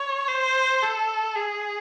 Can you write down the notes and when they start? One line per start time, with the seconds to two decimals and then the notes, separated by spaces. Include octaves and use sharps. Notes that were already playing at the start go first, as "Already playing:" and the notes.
Already playing: C#5
0.28 C5
0.82 A4
1.35 G#4